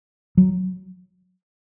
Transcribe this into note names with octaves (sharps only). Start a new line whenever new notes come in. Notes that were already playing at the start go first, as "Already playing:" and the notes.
F#3